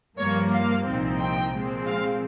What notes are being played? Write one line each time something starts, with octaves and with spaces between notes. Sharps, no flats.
G2 F3 A#3 C#5
F5
C2 A#2 F3 C4 D#4
G5
A#2 F3 G#3 C4
F5